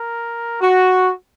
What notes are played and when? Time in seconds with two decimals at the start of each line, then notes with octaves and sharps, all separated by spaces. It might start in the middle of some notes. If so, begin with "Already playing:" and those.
Already playing: A#4
0.61 F#4